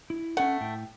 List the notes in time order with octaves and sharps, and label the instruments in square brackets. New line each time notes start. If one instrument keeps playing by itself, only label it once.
[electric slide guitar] E4
[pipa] A3 F#5 [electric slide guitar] C#4 A4
[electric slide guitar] A2 G5